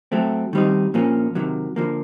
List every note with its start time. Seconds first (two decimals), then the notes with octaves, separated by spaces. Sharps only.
0.12 F#3 A3 C4
0.53 D#3 G3 C4 D#4
0.94 A#2 F3 A#3 C#4
1.35 C3 D#3 F#3
1.76 D3 F3 A#3